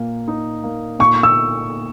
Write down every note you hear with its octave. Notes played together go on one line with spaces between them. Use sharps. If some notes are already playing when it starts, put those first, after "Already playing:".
Already playing: A#2 A#3
D#4
A#3
A#2 C#6
E6